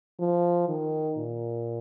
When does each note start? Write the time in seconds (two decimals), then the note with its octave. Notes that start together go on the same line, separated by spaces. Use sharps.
0.20 F3
0.68 D#3
1.18 A#2